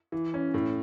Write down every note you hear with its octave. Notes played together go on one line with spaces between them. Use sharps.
E3
C#4
A2